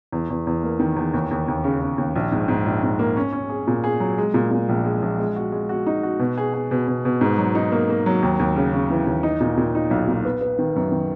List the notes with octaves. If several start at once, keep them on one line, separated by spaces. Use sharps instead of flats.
E2
E2
E2
A#3
D#3
E2
D#2
D#2
D#2
C#3
C#3
D#2
A#1
G#2
G#2
A#1
G#2
A#3
C#4
C#4
G#4
A#2
G#4
F#3
G#3
A#2
A#2
A#1
G#3
A#1
G#3
F#4
G#3
F#4
D#4
F#4
B2
G#4
G#4
B2
B2
B2
G#2
F#3
D#4
A#3
A#3
F#3
D#2
D#2
C#3
C#3
E3
D#2
D#4
A#2
A#2
D#4
B1
A#2
B3
B3
D#3
F#2
D#3